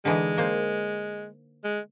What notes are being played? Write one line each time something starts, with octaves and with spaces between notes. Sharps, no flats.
D3 E3 G#3 D#4
A#3 C5
G#3